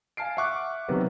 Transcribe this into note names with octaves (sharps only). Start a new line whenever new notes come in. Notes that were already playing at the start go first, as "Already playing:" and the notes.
F5 G#5 A5 F6 C7 D7
E5 F#5 C#6 D6 F#6
C3 D#3 F#3 B3 F#4 B4